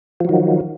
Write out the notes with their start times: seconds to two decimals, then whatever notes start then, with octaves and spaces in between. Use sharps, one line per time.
0.20 F3
0.25 F#3
0.29 D#3